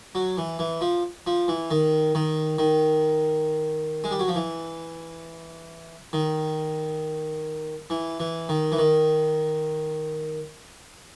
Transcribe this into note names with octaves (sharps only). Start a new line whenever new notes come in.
F#3
E3
E3
F3
F3
E3
D#3
D#3
D#3
G#3
G3
F#3
F3
E3
D#3
E3
E3
D#3
E3
D#3